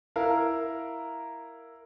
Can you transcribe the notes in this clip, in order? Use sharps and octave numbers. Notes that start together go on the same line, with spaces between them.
E4 A#4 F5